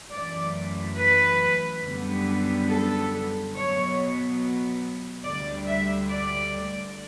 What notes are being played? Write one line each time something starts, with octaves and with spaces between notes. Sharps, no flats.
F#2 E3 A3 D5
B4
F#2 D3 G3 B3
A4
B2 F#3 B3 C#5
D2 D3 G3 D5
E5
D5